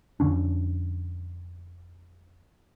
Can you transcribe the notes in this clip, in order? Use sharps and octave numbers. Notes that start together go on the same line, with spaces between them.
F2 D3 C#4 D4